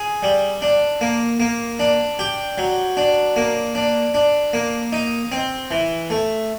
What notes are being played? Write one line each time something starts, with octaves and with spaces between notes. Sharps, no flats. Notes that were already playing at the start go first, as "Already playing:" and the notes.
Already playing: G#4
G3
D4
A#3
A#3
D4
G4
F#3
D4
A#3
D4
D4
A#3
D#4
C4
E3
A3